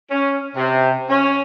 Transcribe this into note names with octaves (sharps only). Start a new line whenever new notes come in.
C#4
C3
C#4